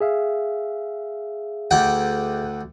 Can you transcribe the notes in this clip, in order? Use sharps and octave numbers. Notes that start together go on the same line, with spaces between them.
G#4 E5 F5
D2 F#5 G5